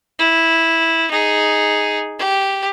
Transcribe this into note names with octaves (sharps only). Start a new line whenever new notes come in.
E4
D#4 G#4
G4